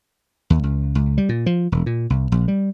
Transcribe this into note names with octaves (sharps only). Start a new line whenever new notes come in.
D#2
C#2
C#2
G3
A#2
F3
E1
A#2
C2
A#1
G3